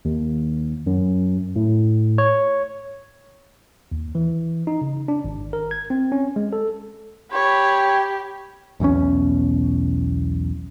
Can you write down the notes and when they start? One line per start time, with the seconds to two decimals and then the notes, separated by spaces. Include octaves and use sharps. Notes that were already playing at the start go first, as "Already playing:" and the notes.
0.05 D#2
0.87 F#2
1.56 A2
2.18 C#5
3.92 D#2
4.15 E3
4.67 D#4
4.81 C#3
5.08 D4
5.24 G#1
5.53 A#4
5.71 G#6
5.90 C4
6.12 C#4
6.36 G#3
6.53 A4
7.32 G4 C#5 B5
8.80 B1 E2 B2 C#4